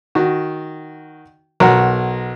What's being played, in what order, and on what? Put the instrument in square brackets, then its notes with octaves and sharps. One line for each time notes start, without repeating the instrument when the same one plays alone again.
[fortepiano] D#3 F#4
B1 F#4 A#4 F#5